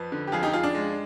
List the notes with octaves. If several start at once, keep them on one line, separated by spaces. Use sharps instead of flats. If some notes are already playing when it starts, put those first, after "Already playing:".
Already playing: F2 B4
D3
G4
F2 F4 G#4
D#4 G4
F2 F4 G#4
D4
G#3